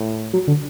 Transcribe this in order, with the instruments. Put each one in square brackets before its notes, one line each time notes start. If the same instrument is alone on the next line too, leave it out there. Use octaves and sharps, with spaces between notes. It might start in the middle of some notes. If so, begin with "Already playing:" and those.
Already playing: [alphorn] A2
[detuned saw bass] F#3
D3